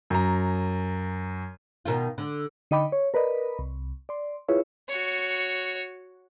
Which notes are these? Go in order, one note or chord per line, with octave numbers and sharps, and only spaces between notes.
F#2 A#5
B2 D#3 F4
D3
D3 D#4 D#5 G5 B5 D6
C#5
A#4 B4 D5 D#5 B5
C2
D5 C6
E4 F4 G#4 B4 C#5 E5
F#4 C#5